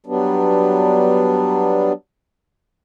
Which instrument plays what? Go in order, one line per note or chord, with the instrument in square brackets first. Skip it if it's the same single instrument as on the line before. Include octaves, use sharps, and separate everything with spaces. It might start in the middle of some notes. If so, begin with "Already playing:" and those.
[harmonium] F#3 G3 B3 D4